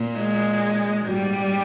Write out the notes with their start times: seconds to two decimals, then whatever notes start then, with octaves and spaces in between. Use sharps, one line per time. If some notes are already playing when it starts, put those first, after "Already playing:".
Already playing: A#2
0.18 G#3
1.06 G#2 G3